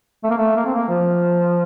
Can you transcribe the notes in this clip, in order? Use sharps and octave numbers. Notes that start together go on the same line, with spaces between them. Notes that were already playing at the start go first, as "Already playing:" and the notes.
A3
A#3
A3
A#3
C4
A#3
F3